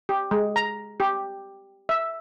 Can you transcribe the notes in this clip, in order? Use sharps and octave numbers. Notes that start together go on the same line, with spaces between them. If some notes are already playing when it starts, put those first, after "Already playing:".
G4
G#3
A#5
G4
E5